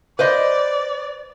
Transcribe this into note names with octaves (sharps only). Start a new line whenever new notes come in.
B4 C5 D5 D#5